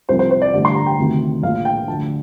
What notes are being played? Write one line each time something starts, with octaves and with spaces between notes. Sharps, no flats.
C2 C3 F3 C5
C5
C5
D5
A1 G2 D3
C6
A#5
G5
D2 C3 D#3
A#1 A2 F3 F5
G5
D2 D3 F3 A5